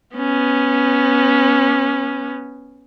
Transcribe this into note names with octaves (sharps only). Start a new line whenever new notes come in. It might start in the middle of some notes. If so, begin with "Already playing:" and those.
B3 C#4